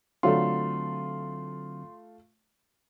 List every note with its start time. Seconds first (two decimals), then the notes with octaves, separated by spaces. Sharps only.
0.23 D3 F#3 A3 C4 F4 C6